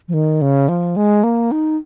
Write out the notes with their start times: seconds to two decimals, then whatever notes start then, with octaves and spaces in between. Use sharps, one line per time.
0.08 F3
0.14 D#3
0.42 C#3
0.68 F3
0.96 G#3
1.24 A#3
1.52 D#4